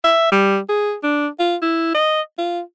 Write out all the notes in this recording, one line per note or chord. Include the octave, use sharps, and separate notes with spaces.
E5
G3
G#4
D4
F4
E4
D#5
F4